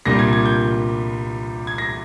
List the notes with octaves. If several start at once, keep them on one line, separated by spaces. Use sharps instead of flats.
C2 A#2 G3 A#3 D4 A#6
G#6
G#6
G6
G#6
A#6